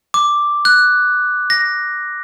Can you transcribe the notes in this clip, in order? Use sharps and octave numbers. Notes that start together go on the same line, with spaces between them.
D6
F#6
A#6